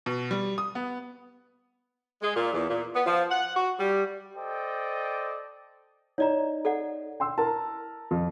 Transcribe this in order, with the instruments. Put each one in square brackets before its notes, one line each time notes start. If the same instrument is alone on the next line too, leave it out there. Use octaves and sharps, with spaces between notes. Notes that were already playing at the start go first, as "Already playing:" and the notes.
[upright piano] B2
G3
D#6
B3
[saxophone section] G#3
A#2
E2
A#2
B3
F3
F#5
F#4
G3
[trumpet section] A4 C5 D5 D#5 G5
[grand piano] D#4 [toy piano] C#5 D5 A#5
[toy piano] A4 D5 F#5
[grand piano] G5 C6 E6
[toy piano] E4 [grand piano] A#4 A5
[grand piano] F2